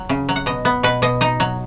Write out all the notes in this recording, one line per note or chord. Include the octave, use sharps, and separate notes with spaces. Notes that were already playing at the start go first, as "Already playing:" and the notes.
Already playing: F#3
C#3
F#3
F#5
B2 D#5
B3
B2 B4
B2 D#5
D#4 D#5
F#3